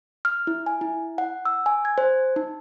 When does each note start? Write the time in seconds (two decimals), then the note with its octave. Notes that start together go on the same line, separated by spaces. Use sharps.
0.25 F6
0.47 E4
0.66 G#5
0.81 E4
1.18 F#5
1.45 E6
1.66 G#5
1.85 G#6
1.98 C5
2.36 D#4